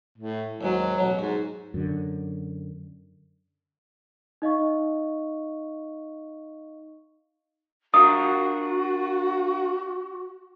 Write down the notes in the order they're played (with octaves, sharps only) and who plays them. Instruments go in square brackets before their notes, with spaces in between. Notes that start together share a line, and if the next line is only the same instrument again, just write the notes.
[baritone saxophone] A2
[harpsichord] D#2 G#2 G#3 [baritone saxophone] F#3
[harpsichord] A1 B2 F#3
[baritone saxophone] G#2 [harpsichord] F#4
[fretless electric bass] F#2 D3
[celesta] D#4 D#5 F5 C#6
[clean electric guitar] D4 F4 A#4 [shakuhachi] F#4 [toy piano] D#6